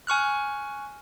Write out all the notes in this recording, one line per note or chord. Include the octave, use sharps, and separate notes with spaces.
G#5 C#6 F6 F#6